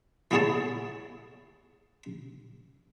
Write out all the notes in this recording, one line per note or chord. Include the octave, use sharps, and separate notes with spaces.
E3 B3 E4 G#4 C#5 A5